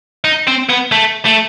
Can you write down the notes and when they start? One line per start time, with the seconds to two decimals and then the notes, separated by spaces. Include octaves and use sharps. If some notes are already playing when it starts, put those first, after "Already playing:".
0.24 D#4
0.47 C4
0.69 B3
0.92 A3
1.26 A3